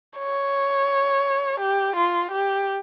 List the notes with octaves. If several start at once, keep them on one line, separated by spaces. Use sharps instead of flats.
C#5
G4
F4
G4